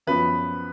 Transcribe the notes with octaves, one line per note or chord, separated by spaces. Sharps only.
F#2 F3 B3 B4